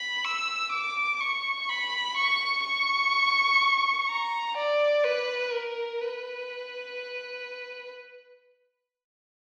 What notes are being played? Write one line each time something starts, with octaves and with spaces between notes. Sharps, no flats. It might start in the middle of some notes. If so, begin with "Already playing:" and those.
Already playing: B5
E6
D6
C#6
B5
C#6
C#6
A#5
D5
B4
A#4
B4